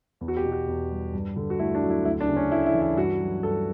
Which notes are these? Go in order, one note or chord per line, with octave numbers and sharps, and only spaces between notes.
E2
F#4
G4
B2
F#4
E2
G3
G2
D3
F#4
A3 E4
D4
F#3
E4
D2 E4
D4
C#3
C#4
A3 E4
E4
E3
E4
G2 F#4
F#3
G2 A4